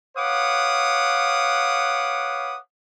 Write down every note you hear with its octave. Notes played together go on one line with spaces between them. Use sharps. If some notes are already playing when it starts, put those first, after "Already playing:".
B4 C#5 F5 F#5 D6 D#6